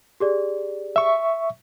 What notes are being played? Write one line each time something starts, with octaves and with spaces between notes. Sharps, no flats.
G4 G#4 D5
E5 C#6